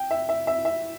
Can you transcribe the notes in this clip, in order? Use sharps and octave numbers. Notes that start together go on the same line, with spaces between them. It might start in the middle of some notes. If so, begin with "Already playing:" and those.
Already playing: G5
E5
E5
E5
E5